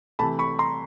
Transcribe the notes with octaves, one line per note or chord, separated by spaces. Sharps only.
C3 E3 A3 A5 B5
B5 C#6
A#5 C6